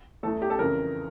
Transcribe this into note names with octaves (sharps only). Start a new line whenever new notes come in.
E2 E3 A3 A4
G4
A4
F2 C#3 E3 A#4